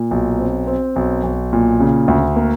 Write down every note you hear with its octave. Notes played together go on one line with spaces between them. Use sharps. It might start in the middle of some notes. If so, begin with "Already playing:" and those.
Already playing: A#2
B1
C4
C4
B1
B1
A#2
C#3
D2
A#3